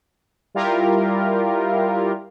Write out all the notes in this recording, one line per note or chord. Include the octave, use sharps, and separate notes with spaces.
G3 E4 F4 G4 A#4